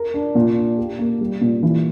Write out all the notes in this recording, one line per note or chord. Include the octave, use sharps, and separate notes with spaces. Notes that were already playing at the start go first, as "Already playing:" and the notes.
Already playing: A#4
D4
A#2
D4
G4
A#3
G3
A#2
E3